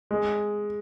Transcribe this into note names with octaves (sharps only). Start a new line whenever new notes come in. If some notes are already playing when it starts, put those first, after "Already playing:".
G#3